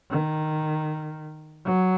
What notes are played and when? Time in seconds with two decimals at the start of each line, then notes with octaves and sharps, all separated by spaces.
0.10 D#3
1.65 F#3